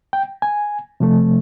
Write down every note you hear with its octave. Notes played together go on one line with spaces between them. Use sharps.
G5
G#5
C3 F3 A3